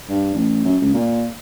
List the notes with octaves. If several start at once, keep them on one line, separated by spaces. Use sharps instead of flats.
G2
A1
F#2
C#2
A#2